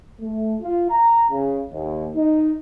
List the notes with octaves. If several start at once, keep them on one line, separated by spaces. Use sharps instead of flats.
A3
F4
A#5
C#3
D#2
D#4